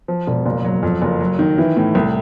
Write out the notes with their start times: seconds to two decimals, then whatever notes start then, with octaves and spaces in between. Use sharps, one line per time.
0.08 F3
0.27 E1
0.46 F#1
0.65 F#3
0.83 F2
1.02 F#1
1.20 F#3
1.39 D#3
1.58 E3
1.77 A2
1.95 C2